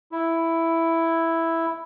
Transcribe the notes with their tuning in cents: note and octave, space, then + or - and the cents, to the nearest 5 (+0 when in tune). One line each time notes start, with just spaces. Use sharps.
E4 +0